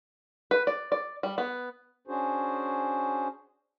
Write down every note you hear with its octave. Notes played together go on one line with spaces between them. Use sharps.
B4
D5
D5
G3
B3
C#4 D4 F#4 G#4 C5